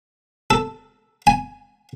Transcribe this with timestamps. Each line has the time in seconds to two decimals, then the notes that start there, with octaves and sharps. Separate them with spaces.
0.51 A4
1.27 G#5